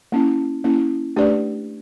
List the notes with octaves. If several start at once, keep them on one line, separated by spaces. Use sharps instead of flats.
A#3 C#4 E4
A#3 C#4 E4
A3 D4 G4 B4 D5